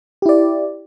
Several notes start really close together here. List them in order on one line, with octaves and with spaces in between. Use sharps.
G4 E4 D5